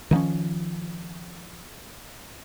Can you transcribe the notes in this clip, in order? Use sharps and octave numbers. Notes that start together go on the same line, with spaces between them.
D#3 F3 A3 C#4